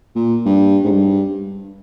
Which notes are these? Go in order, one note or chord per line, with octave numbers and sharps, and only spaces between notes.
A#2
G2
G#2
G2